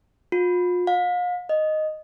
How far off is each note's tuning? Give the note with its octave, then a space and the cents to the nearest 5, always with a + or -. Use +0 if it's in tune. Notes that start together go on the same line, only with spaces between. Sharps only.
F4 +35
F5 +40
D#5 -5